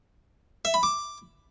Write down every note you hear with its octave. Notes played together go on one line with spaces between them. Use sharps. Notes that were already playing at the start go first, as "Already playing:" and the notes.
E5
B5
D6